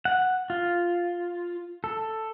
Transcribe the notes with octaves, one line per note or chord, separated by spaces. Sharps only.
F#5
F4
A4